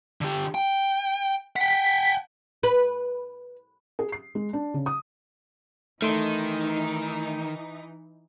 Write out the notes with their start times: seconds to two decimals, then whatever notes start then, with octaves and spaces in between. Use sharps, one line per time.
0.21 D3 G4
0.55 G5
1.56 F#5 G5 B6
2.63 B4
3.99 G#4
4.12 C7
4.35 G#3
4.53 D4
4.74 C#3
4.86 D#6
6.02 D#3 E3 A3 D#4 C6